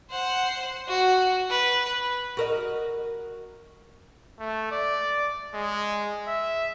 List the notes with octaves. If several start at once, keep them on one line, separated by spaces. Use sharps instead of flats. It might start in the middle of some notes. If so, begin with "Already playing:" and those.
C5 F#5
F#4
B4
F#4 A#4 D#5
A3
D5
G#3
E5